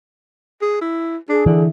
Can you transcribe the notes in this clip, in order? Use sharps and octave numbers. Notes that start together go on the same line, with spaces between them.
G#4
E4
D4 G#4
D3 E3